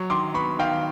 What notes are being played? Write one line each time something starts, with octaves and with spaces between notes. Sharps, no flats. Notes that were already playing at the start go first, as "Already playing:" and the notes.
Already playing: F#3 C#6
D#3 C6 D6
B3 B5 C#6
D#3 F5 G5